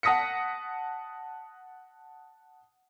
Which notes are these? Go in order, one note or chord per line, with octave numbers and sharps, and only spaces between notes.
F#5 A5 D#6 A#6 B6 C#7